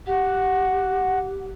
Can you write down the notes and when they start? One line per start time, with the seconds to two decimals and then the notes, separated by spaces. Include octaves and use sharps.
0.07 G4 F#5